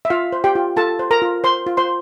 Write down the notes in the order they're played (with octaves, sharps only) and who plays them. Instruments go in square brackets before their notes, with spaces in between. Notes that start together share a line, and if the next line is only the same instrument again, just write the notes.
[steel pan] E5
F4 F5
C5
G4 G5
F4
F4 A4 A5
C5
A#4 A#5
F4
C5 C6
F4
C5 C6